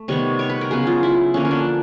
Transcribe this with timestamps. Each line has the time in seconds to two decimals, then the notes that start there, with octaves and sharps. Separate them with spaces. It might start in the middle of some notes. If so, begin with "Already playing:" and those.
Already playing: A3
0.08 C3 D#3 G3 B3 C#5
0.39 C#5
0.50 B4
0.61 A#4
0.71 C#3 F#3 B3 G#4
0.87 F4
1.03 E4
1.34 D3 F3 A#3 C#4
1.45 C#4
1.51 D4